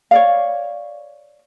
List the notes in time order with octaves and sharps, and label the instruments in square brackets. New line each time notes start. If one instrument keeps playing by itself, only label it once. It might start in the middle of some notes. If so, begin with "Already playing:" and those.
[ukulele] C#5 D5 F5